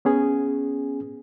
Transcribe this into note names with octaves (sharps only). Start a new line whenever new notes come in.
B3 C#4 G#4